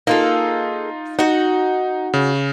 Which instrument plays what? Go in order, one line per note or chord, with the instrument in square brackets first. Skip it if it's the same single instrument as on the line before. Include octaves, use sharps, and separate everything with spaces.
[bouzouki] A#3 G#4 A4 [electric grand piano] D#4 F4
[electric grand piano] D#4 [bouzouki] F#4 F#5
[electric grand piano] C#3